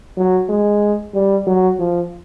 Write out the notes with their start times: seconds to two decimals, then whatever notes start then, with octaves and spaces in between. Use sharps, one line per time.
0.17 F#3
0.49 G#3
1.14 G3
1.47 F#3
1.79 F3